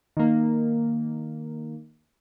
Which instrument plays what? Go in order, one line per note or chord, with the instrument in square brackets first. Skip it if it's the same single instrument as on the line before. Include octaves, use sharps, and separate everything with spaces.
[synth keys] D#3 A#3